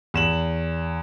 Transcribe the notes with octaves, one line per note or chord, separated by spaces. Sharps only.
E2 E7 F#7